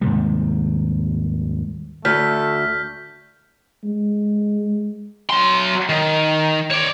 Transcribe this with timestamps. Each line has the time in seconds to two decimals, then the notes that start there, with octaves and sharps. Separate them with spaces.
0.01 D#2 G#2 C3 G3
2.05 D2 A3 F6 G6 B6
3.84 G#3
5.29 F#3 C6
5.89 D#3
6.71 C#5 D5